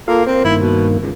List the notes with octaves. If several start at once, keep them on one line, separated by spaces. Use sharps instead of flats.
A#3 F4 A4 F5
C4 A#4 C5
G2 D#3 A#3 E4
B2
C#2